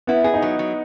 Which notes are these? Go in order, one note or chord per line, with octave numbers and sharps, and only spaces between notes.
B3 E4
B3 G#4
D#4
F#3
F#3